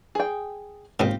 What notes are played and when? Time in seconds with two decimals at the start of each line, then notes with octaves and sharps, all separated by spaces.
0.15 G#4 G5
1.00 D#2 G#2 C#3 C4 F4 G4